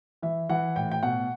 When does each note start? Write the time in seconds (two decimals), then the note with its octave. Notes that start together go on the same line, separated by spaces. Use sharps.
0.22 E3 E5
0.49 E3 F#5
0.76 A2 G5
0.92 G5
1.03 B2 F#5